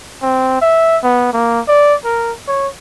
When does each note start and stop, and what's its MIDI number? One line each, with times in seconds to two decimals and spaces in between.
0.22 0.61 60
0.62 0.98 76
1.03 1.29 59
1.33 1.60 58
1.68 1.94 74
2.05 2.32 70
2.48 2.68 73